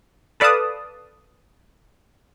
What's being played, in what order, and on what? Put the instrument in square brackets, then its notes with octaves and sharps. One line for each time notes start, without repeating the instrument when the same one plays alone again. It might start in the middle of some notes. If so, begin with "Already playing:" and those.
[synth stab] A4 B4 D5 F5 A5 D#6